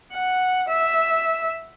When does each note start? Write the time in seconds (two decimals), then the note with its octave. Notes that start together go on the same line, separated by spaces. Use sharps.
0.13 F#5
0.69 E5